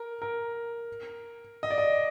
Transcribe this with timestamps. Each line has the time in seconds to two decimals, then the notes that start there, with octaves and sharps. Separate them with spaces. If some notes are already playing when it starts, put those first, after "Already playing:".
Already playing: A#4
0.22 A#4
1.63 D#5
1.70 D5
1.78 D#5